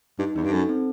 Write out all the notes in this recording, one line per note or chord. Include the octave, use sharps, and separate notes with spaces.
G2 D#4
E2 D#4
G2
F#2 A4
C4